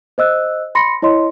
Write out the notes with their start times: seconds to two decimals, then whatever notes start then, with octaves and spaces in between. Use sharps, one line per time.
0.18 C5 D#5 E6 F#6
0.75 B5 C6 A#6 C#7
1.02 E4 C#5 D#5 C6